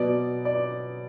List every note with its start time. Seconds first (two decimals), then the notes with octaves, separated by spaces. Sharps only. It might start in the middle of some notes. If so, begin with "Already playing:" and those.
Already playing: B2 F#3 B3 D5
0.45 D5